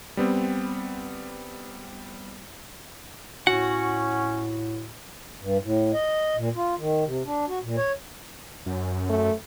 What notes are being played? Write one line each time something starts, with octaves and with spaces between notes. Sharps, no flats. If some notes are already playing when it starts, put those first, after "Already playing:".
G3 B3 C4
A2 C#4 F#4 F#5
G2
A2
D#5
A#2
F4
D#3
C3
D4
F#4
A#2
C#5
F#2
A3